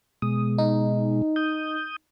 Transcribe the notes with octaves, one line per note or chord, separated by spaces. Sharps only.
B2 G#3 D#6
D#4
D#6 G6